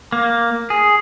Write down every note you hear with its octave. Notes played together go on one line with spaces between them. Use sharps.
A#3
G#4